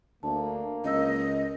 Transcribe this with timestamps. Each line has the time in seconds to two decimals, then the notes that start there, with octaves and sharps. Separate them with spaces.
0.23 D2 A#3 A5
0.84 C#2 A#4 D#5 E6